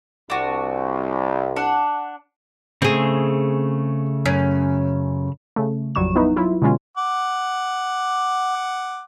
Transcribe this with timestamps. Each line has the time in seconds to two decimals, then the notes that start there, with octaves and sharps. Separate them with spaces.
0.30 C2 D4 F#4
1.56 D4 F#5
2.82 C#3 A3 C4 G#4
4.26 F#2 C#4
5.56 C#3 A3
5.95 A1 F2 F#3 G3 C#6 E7
6.15 B3 D#4 E4 B4
6.36 F#3 E4 F4
6.62 B2 D3 G#3 C#4 F4
6.97 F#5 D6